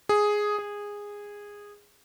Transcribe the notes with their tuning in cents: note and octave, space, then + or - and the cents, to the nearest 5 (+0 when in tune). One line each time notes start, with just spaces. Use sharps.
G#4 +0
G#4 -15